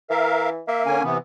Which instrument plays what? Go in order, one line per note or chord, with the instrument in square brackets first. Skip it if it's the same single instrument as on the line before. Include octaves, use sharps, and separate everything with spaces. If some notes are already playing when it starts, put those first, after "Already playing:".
[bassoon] E3 [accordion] A#4 E5 F5
[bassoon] A#3 [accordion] E5
[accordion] D3 C#4 G#5
C3 E3 B3